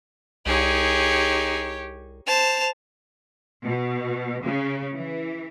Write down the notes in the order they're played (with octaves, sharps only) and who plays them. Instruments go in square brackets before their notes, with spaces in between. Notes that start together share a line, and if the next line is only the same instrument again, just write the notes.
[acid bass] C2 [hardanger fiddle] D#4 G#4 [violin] G4 C#5
[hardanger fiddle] C5 A5 [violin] F7
[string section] B2
C#3
E3